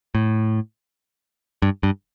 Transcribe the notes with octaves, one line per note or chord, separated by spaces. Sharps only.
A2
G2
G2